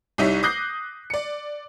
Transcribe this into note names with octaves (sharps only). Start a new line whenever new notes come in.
C2 G3 D#4 E4 C#5 B6
D6 D#6 F#6 G6 A#6 C7
D5 C#7